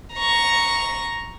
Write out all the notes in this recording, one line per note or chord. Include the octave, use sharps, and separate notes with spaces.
A#5 C#6